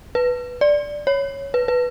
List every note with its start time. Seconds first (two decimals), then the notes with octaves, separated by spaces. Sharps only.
0.15 B4
0.61 D5
1.07 C#5
1.54 B4
1.68 B4